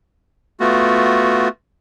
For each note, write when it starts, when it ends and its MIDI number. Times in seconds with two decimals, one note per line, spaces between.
0.60 1.48 57
0.60 1.48 59
0.60 1.48 65
0.60 1.48 66